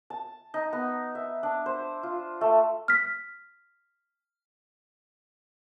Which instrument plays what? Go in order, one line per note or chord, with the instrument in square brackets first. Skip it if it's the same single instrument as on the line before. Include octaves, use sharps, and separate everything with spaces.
[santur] A5
D#4
B3
E5
D4
C5
F4
A3
[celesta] F6 B6